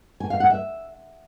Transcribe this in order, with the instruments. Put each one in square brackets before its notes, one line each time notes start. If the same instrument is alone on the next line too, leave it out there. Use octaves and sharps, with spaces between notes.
[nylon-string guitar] G#5
F5
F#5
E5